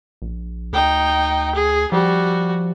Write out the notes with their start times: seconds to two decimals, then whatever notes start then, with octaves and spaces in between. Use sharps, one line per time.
0.22 A#1
0.73 D2 D#4 G5
1.55 G#4
1.92 F3 G3 F#4